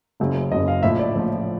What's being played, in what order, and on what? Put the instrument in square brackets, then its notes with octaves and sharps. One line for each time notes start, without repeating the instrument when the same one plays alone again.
[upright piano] F#1 F#2 C#3
F#1 F#2 C#3 D#5
F5
A#1 A2 F3 E5
D5
A#1 A2 F3